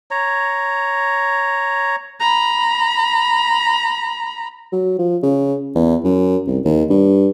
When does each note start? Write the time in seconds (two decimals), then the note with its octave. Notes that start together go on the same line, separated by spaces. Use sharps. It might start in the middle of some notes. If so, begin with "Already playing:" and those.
0.11 C#5 A#5
2.20 A#5 B5
4.72 F#3
4.99 F3
5.23 C#3
5.75 E2
6.04 F#2
6.47 C2
6.65 D#2
6.90 G2